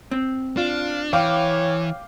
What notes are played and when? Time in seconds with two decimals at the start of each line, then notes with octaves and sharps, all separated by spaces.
0.11 C4
0.57 D4 F4
1.13 E3 C#5 F5 G5 D6